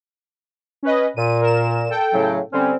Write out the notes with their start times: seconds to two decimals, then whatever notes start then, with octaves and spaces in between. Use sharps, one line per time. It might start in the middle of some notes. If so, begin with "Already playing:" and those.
0.83 C#4 B4 D#5
1.16 A#2 D#7
1.41 A#4 E7
1.89 A4 G5
2.13 A2 C#3 F#3
2.52 D3 G3 C4 C#4